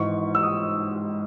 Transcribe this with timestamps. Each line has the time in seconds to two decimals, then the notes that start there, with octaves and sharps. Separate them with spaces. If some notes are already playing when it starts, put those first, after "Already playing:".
Already playing: G#1 G#2 E3 C#6
0.35 E6
0.43 D#6